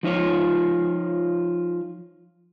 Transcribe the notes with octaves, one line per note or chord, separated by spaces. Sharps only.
F3 D#4 F4 C#5